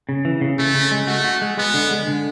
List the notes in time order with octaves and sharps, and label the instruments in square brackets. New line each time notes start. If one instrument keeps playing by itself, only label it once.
[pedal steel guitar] C#3
E3
C#3
[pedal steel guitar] C#3 [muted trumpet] A3
[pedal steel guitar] C#3
G#3
[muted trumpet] A3 [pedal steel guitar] F#4
[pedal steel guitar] F#4
G#3
[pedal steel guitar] G#3 [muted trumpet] B3
[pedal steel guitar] D3
G#3
D3